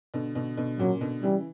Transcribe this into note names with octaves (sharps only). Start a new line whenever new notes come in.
B2 D3
B2 D3
B2 D3
A#2 C#3 F#3
B2 D3
C#3 E3 G3